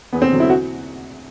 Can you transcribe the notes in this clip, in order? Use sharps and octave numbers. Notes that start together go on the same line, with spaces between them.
E2 B3
C4
D3 F#3
E4
F#4